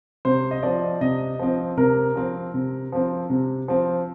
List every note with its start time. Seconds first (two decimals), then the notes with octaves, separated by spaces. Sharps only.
0.25 C3 C5
0.51 D#5
0.63 F3 C4 D5
1.01 C3 D#5
1.39 F3 C4
1.77 C3 A#4
2.16 F3 C4
2.54 C3
2.92 F3 C4
3.30 C3
3.68 F3 C4